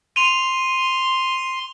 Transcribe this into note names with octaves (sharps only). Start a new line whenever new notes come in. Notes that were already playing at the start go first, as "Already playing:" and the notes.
C6 D#7 F7